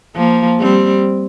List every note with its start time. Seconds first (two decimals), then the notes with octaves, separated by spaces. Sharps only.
0.16 F3 A#3
0.61 G3 C4